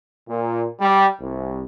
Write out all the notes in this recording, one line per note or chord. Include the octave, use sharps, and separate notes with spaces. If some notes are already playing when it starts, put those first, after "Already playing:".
A#2
G3
C2